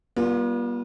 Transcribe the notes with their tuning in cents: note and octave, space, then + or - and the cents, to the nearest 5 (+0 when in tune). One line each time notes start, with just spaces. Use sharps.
G3 +0 B3 -45 F4 +0